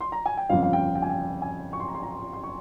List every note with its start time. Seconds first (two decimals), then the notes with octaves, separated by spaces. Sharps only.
0.00 C6
0.12 A#5
0.26 G#5
0.37 G5
0.49 G1 F2 C#3 F5
0.63 F5
0.73 G5
0.95 G5
1.02 G#5
1.10 G5
1.42 G#5
1.73 C#6
1.80 C6
1.88 A#5
1.95 C6
2.03 A#5
2.33 C6
2.43 C#6